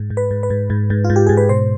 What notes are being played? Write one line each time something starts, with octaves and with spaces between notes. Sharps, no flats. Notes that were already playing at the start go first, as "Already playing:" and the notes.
Already playing: G#2
G#2
B4
G#2
B4
G#2
G#2
G#2
F4
G#2
G4
G#2 G#4
B4
B2 C5